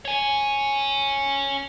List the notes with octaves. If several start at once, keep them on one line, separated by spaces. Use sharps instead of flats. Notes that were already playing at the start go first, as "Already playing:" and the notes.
C#5 G#5